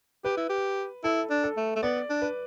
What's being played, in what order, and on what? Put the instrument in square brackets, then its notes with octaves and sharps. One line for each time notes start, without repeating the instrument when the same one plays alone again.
[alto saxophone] G4 [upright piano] B4
[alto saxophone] E4
G4
[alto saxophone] E4 [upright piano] A4
[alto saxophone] D4
[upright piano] A4
[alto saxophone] A3
A3
[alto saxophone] B3 [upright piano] D5
[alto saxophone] D4
[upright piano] B4